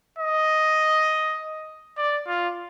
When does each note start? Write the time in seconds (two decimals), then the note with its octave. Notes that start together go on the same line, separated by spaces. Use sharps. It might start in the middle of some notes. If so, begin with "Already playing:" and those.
0.19 D#5
1.98 D5
2.27 F4